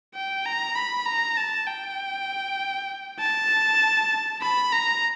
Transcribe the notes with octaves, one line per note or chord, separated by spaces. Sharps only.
G5
A#5
B5
A#5
A5
G5
A5
B5
A#5